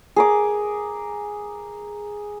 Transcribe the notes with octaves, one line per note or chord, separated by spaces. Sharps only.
G#4 A#4 D6